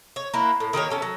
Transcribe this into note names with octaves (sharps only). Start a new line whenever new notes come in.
C#5
A#3 E4 F#4
A2
D#3 A#3 G4 C#5
A3 C#4 A5
F#3